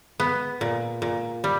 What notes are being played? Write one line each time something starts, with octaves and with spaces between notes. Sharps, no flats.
B3
A#2
A#2
G3